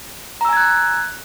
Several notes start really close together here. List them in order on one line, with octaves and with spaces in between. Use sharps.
A#5 E6 G#5 G#6 F#6